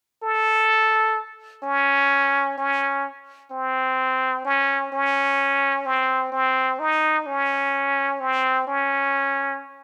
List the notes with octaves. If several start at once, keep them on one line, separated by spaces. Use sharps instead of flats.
A4
C#4
C#4
C4
C#4
C#4
C4
C4
D#4
C#4
C4
C#4